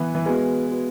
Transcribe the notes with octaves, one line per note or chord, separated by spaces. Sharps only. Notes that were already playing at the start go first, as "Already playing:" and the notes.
Already playing: E3 B3
E3
G#3 B3 F#4 B4
B3 F#4 B4